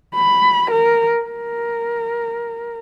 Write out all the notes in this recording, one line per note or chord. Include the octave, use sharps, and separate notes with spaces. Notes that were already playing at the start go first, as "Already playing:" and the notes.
B5
A#4
A#4